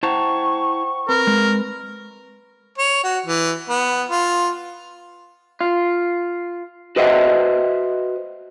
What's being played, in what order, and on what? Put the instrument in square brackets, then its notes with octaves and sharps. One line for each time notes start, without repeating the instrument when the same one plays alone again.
[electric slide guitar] E4 A5 A#5 [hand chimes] C5 F#5 G5 [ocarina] C#6
[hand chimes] C4 B4 B5 [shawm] A#4
[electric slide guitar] G#3
[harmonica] C#5
F#4
E3
B3
F4
[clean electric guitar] F4
F#4 B4 C5 D#5 E5 F#5